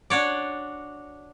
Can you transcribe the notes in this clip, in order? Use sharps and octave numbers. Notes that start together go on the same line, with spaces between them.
D4 F#4 C#5 D5